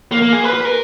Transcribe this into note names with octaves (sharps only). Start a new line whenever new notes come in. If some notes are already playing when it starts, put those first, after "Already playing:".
A#3
A#3
G#4
B4
B4
A#4